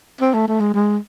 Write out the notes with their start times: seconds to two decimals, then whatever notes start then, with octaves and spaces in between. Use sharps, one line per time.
0.21 C4
0.34 A3
0.48 A3
0.60 G#3
0.74 G#3